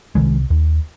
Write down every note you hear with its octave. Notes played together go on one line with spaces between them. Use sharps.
C2 C3 D#3 G#3
D#2